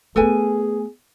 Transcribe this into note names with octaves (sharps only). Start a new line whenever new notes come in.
A3 B3 G#4 A4 B4 G#5